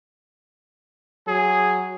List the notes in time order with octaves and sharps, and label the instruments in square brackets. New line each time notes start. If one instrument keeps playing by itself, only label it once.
[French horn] F#3 [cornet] G#4